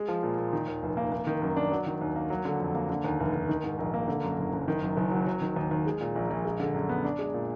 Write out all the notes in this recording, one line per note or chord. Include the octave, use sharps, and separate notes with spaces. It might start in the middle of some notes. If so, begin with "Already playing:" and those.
Already playing: G#3
F3
A#2
A#2
D#3
D#2
F1
A#3
A#3
D#3
F#2
D4
F#3
D#3
D#2
A#3
F#3
D3
F2
A#3
D3
D#2
F1
F1
D#3
G#2
A#1
A#3
D3
F#2
F#1
F#1
D#3
F#2
F#1
F#3
F#3
D#3
D#2
D#2
G#3
A#2
A#1
A#1
G#3
D3
F#2
B3
D4
G#3
A#2